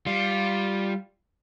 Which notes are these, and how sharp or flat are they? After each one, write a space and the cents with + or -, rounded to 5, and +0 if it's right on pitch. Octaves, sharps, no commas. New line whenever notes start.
G3 +0 F4 +0